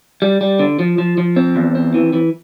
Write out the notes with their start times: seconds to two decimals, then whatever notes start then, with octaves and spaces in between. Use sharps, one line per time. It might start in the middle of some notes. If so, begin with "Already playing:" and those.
0.22 G3
0.41 G3
0.59 D3
0.79 F3
0.98 F3
1.18 F3
1.36 C4
1.56 E2
1.75 C4
1.94 E3
2.13 E3